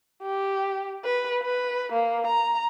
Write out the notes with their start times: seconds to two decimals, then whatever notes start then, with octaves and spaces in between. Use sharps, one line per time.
0.23 G4
1.05 B4
1.43 B4
1.93 A#3
2.27 A#5